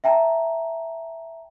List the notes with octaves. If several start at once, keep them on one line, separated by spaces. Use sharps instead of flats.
E5 G5 A5 A#5